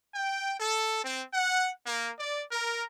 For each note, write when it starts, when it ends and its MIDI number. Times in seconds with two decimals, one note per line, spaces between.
0.14 0.54 79
0.59 1.02 69
1.03 1.22 60
1.33 1.69 78
1.85 2.10 58
2.18 2.43 74
2.52 2.84 70